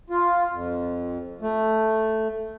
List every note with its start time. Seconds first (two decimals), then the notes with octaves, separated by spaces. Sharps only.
0.10 F4
0.53 F2
1.42 A3